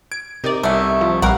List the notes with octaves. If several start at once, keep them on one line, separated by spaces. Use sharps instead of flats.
G#6 D7
C3 D#4 A#4 D5 D#5
C2 A3 C#4 E5
F3
A#1 G3 A#4 B4 F5 F#5